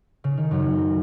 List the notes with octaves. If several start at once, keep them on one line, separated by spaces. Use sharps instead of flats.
C#3
D#3
F#2 F#3